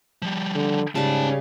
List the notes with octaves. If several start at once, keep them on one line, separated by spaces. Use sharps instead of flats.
F3 G3
D3
G#2 C#3 G3 C#4 A5